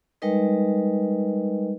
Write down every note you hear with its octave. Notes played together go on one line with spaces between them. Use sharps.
G3 G#3 D#4 A#4 B4 D#5